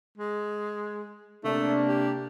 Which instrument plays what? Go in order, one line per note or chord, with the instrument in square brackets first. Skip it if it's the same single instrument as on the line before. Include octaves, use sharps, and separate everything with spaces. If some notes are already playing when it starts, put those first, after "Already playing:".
[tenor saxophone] G#3
[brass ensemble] C3 A#3 D4 [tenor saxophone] A3
[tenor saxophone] G4